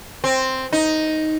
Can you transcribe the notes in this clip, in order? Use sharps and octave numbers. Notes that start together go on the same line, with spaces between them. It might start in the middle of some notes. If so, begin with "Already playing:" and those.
C4
D#4